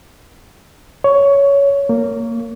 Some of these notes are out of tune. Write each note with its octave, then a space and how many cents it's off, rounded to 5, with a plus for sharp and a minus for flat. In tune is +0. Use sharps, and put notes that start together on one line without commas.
C#5 +15
A#3 -15